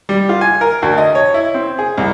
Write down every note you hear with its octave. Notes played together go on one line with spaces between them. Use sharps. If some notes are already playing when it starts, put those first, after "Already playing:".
G3
F4
G#5
A#4
D2
D#5
C#5
E4
C4
G#4
C2